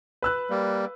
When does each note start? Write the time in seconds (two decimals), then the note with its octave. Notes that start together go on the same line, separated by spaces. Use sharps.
0.22 B4 E6 F#6
0.50 G3 A#3